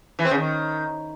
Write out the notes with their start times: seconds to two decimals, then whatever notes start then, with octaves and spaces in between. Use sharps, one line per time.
0.19 E3
0.25 C4
0.31 C#3
0.37 D#3